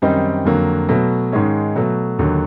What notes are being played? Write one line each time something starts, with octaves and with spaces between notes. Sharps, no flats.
F#2 D#3 G3 C4 D#4
F2 D3 F#3 A#3
B2 F#3 A3
G#2 D#3 G#3 C#4
B2 F#3 A3
D#2 D3 F#3